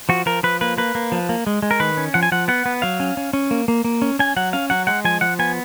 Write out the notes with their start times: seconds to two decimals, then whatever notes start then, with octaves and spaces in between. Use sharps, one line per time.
0.09 F3 F#4
0.26 F3 A#4
0.43 F3 B4
0.61 A#3 B4
0.78 A#3 B4
0.95 A#3
1.12 F3
1.29 A#3
1.47 G#3
1.62 G#3
1.71 A#4
1.80 D#3 B4
1.97 C#4
2.14 F3 F#5
2.23 G#5
2.32 F3 F#5
2.48 B3 F#5
2.66 B3
2.82 F#3 F5
3.00 C#4
3.17 C#4
3.33 C#4
3.51 A#3
3.68 A#3
3.84 A#3
4.02 C#4
4.19 C#4 G#5
4.36 F#3 F#5
4.53 C#4 F5
4.70 F#3 F#5
4.87 G#3 F#5
5.05 F3 G#5
5.21 F3 F#5
5.39 B3 G#5